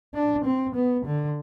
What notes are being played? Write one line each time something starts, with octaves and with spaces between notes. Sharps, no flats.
D4
C4
B3
D3